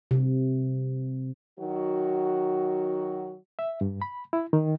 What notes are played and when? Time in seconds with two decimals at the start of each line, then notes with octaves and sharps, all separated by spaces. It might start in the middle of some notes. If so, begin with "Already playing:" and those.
0.11 C3
1.59 D#3 F#3 F#4
3.59 E5
3.81 G2
4.02 B5
4.33 E4
4.53 D#3